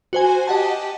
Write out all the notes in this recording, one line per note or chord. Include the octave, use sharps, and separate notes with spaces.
F#4 C5 G#5
G4 D#5 F#5 A5